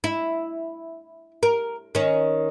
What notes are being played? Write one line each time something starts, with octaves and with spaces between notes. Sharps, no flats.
E4
A#4
D#3 C#4